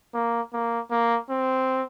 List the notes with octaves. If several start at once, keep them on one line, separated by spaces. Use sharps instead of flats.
A#3
A#3
A#3
C4